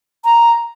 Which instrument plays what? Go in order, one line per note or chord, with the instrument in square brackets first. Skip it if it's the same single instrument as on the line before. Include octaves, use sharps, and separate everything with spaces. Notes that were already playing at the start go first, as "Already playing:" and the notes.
[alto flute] A#5